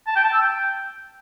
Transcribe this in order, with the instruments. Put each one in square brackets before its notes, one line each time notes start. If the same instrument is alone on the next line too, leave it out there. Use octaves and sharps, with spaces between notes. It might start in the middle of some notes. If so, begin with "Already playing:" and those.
[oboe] A5
G5
A5
E6
G5